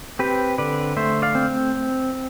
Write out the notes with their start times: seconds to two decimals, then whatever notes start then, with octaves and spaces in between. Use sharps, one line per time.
0.19 C4 G4 B4
0.58 D3 B4 D5
0.97 A3 C5 E5
1.22 D5 F5
1.35 C4